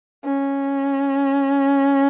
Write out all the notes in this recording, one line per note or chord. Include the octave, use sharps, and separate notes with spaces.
C#4